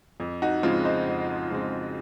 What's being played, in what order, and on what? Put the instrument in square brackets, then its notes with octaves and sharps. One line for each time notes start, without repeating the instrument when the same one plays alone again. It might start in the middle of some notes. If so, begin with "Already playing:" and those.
[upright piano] F2
D#4 F#4
C#3 F3 G#3 C4 F4
C5 D#5
F2
C#3 F3 G#3 C4